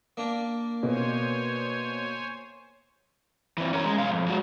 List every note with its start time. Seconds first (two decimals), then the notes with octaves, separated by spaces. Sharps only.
0.17 A#3 D4
0.83 B2 C5 C#5 G#5
3.58 E3 C4
3.73 C#4 A#4
3.85 G#3
3.98 B1 F5
4.13 F2
4.28 G#3 F#4